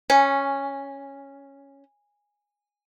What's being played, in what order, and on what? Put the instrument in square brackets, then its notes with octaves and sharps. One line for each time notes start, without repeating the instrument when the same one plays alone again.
[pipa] C#4 [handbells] G#5